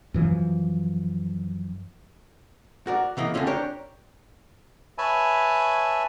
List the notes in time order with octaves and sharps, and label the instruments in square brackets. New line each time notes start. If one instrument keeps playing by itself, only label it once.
[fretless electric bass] F#2 E3 F3
[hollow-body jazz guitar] F#4 A#4 D5
C#3 E3 A#3 D#5
F2 D3 A3 C#4 F4
D4 G4 A#4 C#5
[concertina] B4 C#5 E5 G#5 A5 B5